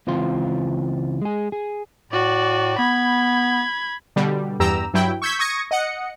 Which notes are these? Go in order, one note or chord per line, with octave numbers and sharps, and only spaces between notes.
C#2 E3 C4 F4 C6
G#3 G#4
G#4
A2 F#4 D5
B3 B5 G#6
B2 D3 G3
E2 G2 G4 A#5 E6
G2 F#3 E4 G5
C#6 E6 G6 G#6 B6
C#6 D#6 G#6 A#6 C#7
D#5 F#5 C#7